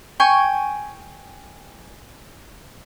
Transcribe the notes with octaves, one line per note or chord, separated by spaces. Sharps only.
G5 G#5 C#6